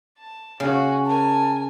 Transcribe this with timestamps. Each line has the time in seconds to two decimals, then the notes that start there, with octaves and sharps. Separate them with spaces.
0.18 A5
0.60 C#3 C#4 F#4 G#5
1.05 A#4 G#5 A5